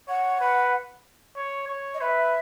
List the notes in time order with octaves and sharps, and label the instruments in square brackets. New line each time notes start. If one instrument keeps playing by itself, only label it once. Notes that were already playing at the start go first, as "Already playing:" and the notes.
[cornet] C#5 [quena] F#5
[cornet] B4
C#5
C#5
[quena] D#5
[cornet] B4 [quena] E5